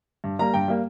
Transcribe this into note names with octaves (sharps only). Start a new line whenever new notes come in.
G2
G3 A#3 A#5
G2 G5
G3 A#3